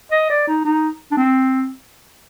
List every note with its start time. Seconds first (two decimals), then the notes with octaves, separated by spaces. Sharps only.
0.11 D#5
0.30 D5
0.48 D#4
0.65 D#4
1.12 D4
1.17 C4